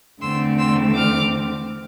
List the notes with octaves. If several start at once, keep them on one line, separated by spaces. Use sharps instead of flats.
E2 D3 A3 C4 C6 E6
C6 E6
D6 F6